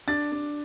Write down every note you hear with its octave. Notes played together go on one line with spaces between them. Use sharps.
D4 A6
D4